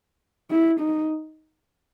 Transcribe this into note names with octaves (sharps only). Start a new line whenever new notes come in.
E4
D#4